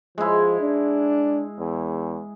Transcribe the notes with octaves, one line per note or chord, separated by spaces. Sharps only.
F3 G#3 E4
D4
E2